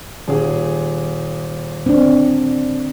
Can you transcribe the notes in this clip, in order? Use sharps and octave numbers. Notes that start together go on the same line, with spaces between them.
D#1 G#4
C4 D4